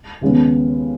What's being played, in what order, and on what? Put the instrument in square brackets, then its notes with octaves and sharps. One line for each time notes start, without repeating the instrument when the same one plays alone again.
[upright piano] D#2 C#3 G#3 B3